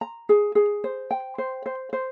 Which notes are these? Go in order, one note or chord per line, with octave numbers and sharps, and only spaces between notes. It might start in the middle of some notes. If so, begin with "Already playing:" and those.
A#5
G#4
G#4
C5
G5
C5
C5
C5